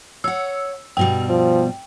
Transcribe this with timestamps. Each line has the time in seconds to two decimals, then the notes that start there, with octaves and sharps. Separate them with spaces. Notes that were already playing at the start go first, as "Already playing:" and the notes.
0.24 C#5 F#5 E6
0.97 G2 B2 G3 G5
1.29 F3